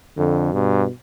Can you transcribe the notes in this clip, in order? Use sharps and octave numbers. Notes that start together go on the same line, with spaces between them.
F2 D3
G2 B2